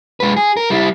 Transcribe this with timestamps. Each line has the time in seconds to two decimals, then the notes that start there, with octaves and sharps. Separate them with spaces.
0.20 G#3 B4
0.36 G#4
0.57 A#4
0.70 G3 E4